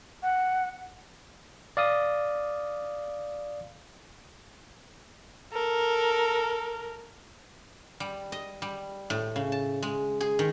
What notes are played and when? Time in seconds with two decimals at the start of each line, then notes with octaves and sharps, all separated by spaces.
0.23 F#5
1.77 D5 F5 D#6
5.53 A4 A#4
8.00 G3
8.32 D#5
8.62 G3
9.10 A2
9.36 C#3
9.52 A5
9.82 G#3
10.21 G#4
10.39 D#3